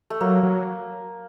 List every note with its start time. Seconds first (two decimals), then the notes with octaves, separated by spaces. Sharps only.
0.10 A3
0.21 F#3 A#3
0.43 F#3